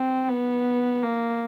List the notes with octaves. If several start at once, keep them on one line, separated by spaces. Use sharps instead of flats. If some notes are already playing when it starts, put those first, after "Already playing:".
Already playing: C4
B3
A#3